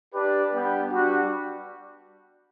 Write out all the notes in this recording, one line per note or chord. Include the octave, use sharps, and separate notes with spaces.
D4 G4 B4 D5
G3 B3 D4 G4
G3 D4 F#4